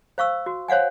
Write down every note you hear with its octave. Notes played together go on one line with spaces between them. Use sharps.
C5 F5 C#6 E6
F#4
C5 C#5 F5 F#5 G#5